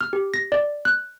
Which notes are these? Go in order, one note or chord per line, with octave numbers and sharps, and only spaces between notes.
F6
G4
A#6
D5
F#6